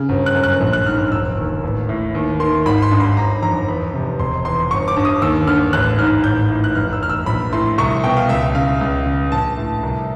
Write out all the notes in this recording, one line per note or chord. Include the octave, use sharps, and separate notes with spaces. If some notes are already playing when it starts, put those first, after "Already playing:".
Already playing: C#3
G1
F#6
F#2
F#6
A#1
F#6
G#2 F6
F6
E1 E6
D#2
A1
A2
D#2
D#3 C6
G#1 B5
C6
G2
B5
G1 A#5
F2 A#5
E2 B5
C3
E1 C6
E2 C6
G1 C#6
D6
G2
D#6
D#2 E6
D3 F6
A1 F#6
G#2 F6
A1 G6
A2
F#6
F1 F6
E6
E2 F6
E6
A#1 B5
A2 C6
C2 C#6
C#6
B2 G5
F5
C#2 E5
C#3 F5
C#2
C#3
A#1 A5
A2
C2